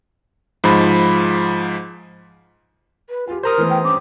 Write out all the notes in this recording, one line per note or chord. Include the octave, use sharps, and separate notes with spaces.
G#2 F3 B5
B4
F4 G4 G#5
A#4 C5 A#5 D#6
E3 A3 B3
G5
G2 C4 C#4 D6